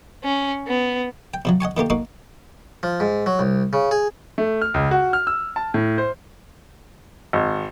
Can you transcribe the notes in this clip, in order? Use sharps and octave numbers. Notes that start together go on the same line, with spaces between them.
C#4
B3
G5
C3 F3 F#3
D#5 F#5 G#5 C#6
D#3 A3 A#3 G4
A#3 D#4 F#4 F5
F3
G#2
F#3
C2
C#3
G#4
A3
F6
C#2
F#4
F6
E6
A5
A2
C5
G#1